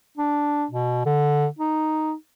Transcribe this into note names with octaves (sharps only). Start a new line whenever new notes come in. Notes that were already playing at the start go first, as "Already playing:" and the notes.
D4
B2
D3
D#4